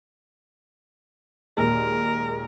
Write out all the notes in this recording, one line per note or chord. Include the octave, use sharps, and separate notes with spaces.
D#2 A#2 G#3 A#4